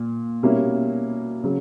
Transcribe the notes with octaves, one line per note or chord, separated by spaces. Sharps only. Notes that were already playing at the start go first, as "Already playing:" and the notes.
Already playing: A#2
B2 G3 A#3 C#4 E4
C#3 F#3